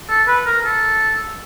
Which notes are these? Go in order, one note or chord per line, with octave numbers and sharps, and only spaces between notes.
A4
B4
A#4
A4